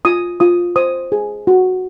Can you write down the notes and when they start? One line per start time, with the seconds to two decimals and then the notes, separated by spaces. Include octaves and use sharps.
0.05 F4 D#6
0.40 F4 D#6
0.76 C5 D#6
1.12 G#4
1.47 F#4